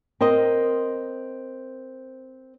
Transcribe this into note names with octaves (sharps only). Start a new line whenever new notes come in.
C4 A#4 C5 D#5